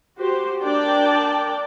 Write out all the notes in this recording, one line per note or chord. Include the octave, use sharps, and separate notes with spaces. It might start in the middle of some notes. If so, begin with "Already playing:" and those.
F#4 G4 C5
D4 A#4 D5 G5 A5